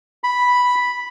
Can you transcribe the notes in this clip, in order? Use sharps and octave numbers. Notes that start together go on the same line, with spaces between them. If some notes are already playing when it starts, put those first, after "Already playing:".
B5